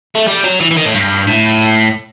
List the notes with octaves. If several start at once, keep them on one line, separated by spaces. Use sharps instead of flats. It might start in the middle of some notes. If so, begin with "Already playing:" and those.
A3
G3
F#3
E3
E3
D#3
A2
G2
A2